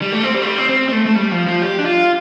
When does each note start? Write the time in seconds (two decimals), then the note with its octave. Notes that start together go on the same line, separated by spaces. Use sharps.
0.02 G3
0.12 A3
0.23 C4
0.34 G3
0.42 A3
0.46 G3
0.58 C4
0.69 C4
0.89 C4
0.92 A3
1.06 A3
1.15 G3
1.31 F3
1.47 F3
1.62 G4
1.79 D4
1.85 F4